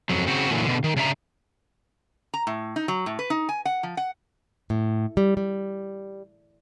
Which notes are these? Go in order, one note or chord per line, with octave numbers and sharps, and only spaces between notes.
F2 F#3
C#3 C4 F#4
A#2 D3 E3 F#3
B2 D3
D#3
C#3 D4 E5 A#5
A#5
A2
D#4
F#3
A2
B4
D#4
G#5
F#5
F3
F#5
A2
G3
G3